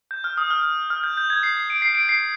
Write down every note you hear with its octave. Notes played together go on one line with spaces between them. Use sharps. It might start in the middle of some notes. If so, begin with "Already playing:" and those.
G6
F6
D#6
F6
F6
G6
G6
G#6
C7
C7
D7
C7
D7
C7